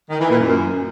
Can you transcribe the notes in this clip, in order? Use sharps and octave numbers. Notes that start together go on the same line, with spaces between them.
D#3
E3
A#2
F#2